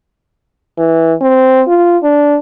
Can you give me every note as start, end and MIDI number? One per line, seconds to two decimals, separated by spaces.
0.78 1.14 52
1.21 1.62 60
1.67 1.98 65
2.03 2.38 62